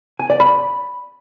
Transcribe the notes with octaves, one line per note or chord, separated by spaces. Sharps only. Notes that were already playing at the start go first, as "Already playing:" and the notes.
G#5
D5
B5